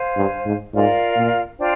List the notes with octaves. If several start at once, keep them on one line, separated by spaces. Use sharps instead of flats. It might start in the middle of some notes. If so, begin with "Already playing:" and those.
Already playing: C5 F5 G#5
G2
G#2
G#2 F4 A#4 D5 F5
A#2
D4 F4 C5 G5